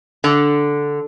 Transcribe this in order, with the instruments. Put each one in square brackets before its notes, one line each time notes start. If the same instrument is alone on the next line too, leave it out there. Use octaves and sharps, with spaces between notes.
[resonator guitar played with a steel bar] D3